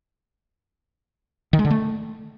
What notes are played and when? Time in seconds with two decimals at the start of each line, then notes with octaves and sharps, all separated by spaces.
1.53 D#3
1.59 G#3
1.65 D3
1.70 A3